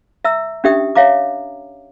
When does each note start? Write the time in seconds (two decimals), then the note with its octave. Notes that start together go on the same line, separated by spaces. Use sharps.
0.25 E5 A#5 E6
0.64 C#4 D4 G4 E5 G5 D#6
0.95 C#5 E5 F5 A#5 D6